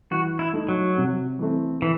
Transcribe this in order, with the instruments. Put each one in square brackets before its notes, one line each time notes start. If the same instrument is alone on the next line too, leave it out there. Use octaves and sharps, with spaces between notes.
[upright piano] E3 [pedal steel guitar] F#4
[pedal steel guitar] E4
[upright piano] A3 D#4
[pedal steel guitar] F#3
[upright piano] C3
E3 A3 C4
[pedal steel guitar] E3